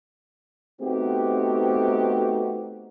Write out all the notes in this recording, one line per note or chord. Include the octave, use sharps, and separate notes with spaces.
A3 B3 C4 D#4 F#4 G4